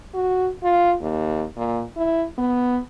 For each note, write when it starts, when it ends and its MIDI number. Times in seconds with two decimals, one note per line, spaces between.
0.14 0.49 66
0.64 0.94 65
1.02 1.44 39
1.57 1.82 46
1.97 2.25 64
2.38 2.79 59